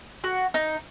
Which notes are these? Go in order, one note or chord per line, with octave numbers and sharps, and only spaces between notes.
F#4
D#4